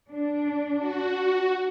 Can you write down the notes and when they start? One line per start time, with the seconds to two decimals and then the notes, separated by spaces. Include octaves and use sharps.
0.12 D4
0.78 F#4